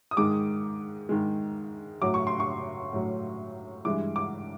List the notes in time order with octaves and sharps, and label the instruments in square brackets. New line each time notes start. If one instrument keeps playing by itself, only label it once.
[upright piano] D#6
G#2 D#3 G#3 D6
G#2 D#3 G#3
A2 F#3 D6
C#6
C6
C#6
A2 F#3
G2 E3 G#3 D6
D6